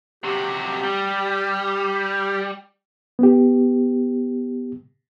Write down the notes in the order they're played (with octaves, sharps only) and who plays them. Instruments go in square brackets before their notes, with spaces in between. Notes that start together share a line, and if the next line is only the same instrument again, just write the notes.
[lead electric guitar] C3 F#4 [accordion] G4
[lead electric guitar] G3
[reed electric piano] B3 G4